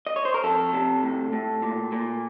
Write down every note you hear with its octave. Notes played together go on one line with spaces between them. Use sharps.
D#5
C#5
C5
A#4
F2 A4
C3
A2
A2
A#2
A#2